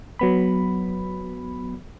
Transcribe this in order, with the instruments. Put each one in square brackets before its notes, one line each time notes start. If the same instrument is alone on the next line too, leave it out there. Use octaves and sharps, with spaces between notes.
[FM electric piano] F#3 B3 B5